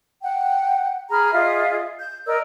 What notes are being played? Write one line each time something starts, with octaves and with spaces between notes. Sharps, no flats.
F#5 G5
G#4 A#5 B5 F6
F4 G#4 D#5 E5
G6
A#4 D5 D#5 E6